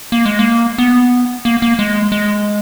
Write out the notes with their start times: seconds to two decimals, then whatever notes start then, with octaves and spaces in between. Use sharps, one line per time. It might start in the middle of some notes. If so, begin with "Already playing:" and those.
0.12 A#3
0.26 G#3
0.39 A#3
0.78 B3
1.45 A#3
1.62 A#3
1.79 G#3
2.12 G#3